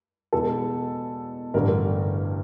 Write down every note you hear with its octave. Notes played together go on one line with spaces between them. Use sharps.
E2 B2 G#3 A4
A1 G2 D3 A#4